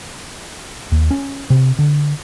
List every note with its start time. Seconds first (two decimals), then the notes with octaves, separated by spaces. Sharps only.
0.92 D#2
1.11 C#4
1.50 C3
1.79 D3